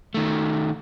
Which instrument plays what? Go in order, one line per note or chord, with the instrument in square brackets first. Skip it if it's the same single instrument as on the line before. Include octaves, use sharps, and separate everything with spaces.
[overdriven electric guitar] D#3 A3